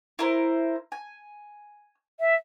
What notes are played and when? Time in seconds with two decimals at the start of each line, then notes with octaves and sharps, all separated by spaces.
0.19 E4 A#4 C5
0.92 G#5
2.20 E5